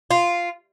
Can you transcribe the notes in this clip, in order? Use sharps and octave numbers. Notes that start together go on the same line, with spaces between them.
F4